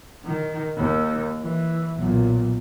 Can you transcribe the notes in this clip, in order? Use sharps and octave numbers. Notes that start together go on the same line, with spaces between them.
D#3
D#2
E3
B1 A#2